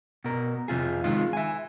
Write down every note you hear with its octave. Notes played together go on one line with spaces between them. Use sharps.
B2 A#4
F2 C3 F4 G#4
D#3 G#3 F4
E5 G#5